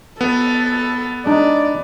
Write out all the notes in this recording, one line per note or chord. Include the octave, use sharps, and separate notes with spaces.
B3 A4
G#3 D4 D#4 D5